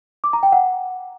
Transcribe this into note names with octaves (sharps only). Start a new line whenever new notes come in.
D6
A#5
G5
F#5